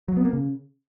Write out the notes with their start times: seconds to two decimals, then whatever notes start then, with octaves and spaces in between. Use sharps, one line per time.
0.08 F#3
0.17 B3
0.25 A#3
0.33 C#3